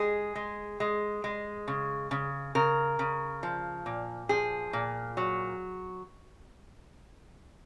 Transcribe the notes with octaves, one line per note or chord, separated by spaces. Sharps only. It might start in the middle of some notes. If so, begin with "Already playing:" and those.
Already playing: G#3 G#4
G#3
G#3
G#3
C#3
C#3
C#3 A#4
C#3
F3
A#2
F3 G#4
A#2
F#3